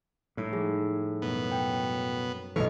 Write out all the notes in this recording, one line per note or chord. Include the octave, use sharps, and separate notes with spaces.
A2 G3 D#4
F3 G3 G#3 G#4
F#2 B2 B3
G5
B1 G#2 E3 A4 C#5 D#5 F5